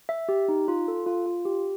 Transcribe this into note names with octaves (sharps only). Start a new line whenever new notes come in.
E5
G4
D#4
F4
A4
F4
F4
G4